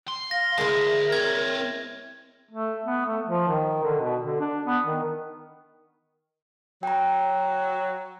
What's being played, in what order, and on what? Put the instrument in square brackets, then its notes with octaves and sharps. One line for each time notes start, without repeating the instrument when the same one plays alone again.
[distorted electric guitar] C6
[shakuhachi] F5 [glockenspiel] A#6
[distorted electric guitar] D2 [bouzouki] G#3 E4 [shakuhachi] A#4
[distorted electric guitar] C4 C#5 [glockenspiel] G#6
[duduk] A3
B3
A3
F3
D#3
D3
B2
D3
D4
B3
D#3
[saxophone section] F#3 [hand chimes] G5 A#5